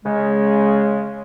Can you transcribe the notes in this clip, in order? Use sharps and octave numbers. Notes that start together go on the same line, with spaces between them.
C#3 G#3